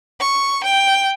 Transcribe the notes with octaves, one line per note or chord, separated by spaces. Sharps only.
C#6
G5